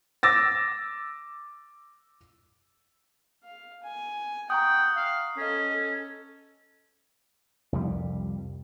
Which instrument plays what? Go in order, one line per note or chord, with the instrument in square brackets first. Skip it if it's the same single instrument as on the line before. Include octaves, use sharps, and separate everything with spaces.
[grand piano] D6 E6 A6 A#6
[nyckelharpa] F5
G#5
[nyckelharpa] F#5 [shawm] G5 [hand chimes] A#5 C#6 D#6
[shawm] F5
[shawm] C#4 [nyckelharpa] A4 D#5
[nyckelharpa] A4
[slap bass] C2 F2 G3